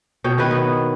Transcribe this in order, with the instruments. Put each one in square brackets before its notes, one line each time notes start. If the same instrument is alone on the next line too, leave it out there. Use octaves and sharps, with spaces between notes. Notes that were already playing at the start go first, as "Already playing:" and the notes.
[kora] B2 C#5 G5
D#3 E4 B4
B3